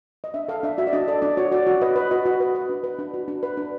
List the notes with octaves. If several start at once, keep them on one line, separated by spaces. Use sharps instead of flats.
D#5
D4 E5
A4 F5
D4 E5
F#4 E5
D5
D4 D#5
A4 D5
D4 D5
F#4 C#5
F#4 D5
F#4
B4 D#5
B4
F#4 D#5
F#4
B4
B4
D4
B4
D4
F#4
D4
B4
D4